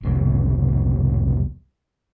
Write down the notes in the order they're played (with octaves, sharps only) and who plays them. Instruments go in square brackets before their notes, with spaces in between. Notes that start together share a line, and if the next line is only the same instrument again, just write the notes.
[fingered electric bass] E1 C2 F2 B2